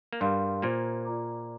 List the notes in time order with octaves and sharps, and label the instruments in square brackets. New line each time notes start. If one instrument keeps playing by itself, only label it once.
[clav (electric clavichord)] A#3
[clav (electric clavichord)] G2 G3 [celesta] G4 A#4 F5 C6
[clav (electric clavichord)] A#2 A#3 [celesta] F4 C5 A#5
[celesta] F4 D5 A#5 D6